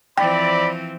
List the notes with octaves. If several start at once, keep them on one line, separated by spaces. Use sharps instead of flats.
E3 F3 C4 D5 G5 B5